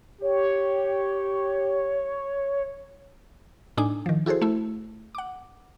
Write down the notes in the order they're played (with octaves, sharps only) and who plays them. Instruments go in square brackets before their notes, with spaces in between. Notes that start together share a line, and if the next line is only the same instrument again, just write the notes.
[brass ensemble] G4 [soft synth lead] C#5
[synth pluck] A2 D4 D#4 G#5 D6
D#3 F3
E4 F#4 G#4 A4 C5
A3 E4
F#5 D6